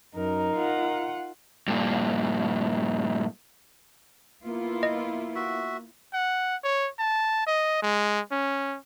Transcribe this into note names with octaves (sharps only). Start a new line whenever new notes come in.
F#2 D#4 A#4
F4 F#5
G2 A#2
A#3 B3 E4 F4
D#5
F#4 E5
F#5
C#5
A5
D#5
G#3
C#4